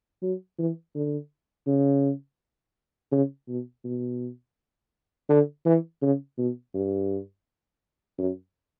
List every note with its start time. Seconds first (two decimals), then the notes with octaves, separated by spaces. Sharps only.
0.22 F#3
0.59 E3
0.95 D3
1.67 C#3
3.12 C#3
3.48 B2
3.85 B2
5.29 D3
5.66 E3
6.02 C#3
6.38 B2
6.74 G2
8.18 F#2